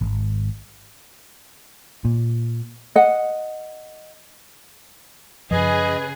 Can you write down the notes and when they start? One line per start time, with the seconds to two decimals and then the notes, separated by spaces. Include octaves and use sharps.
0.01 G#1
2.05 A#2
2.95 D#5 F#5
5.51 F#2 C#3 F3 G#4 B4 D#5